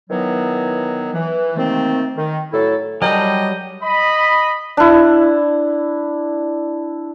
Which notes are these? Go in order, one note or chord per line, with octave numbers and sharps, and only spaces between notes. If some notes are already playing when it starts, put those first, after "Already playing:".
D#3 E3 F#3 B3
E3
C3 D#3 A3 A#3 C4
D#3
A2 F#3 E4 A4
F#3 G3 D4 G#4 A#4 D#5 G5
D#5 B5
D4 E4